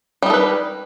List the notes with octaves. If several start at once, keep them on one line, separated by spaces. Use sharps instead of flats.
G3 G#3 D#4 A4 B4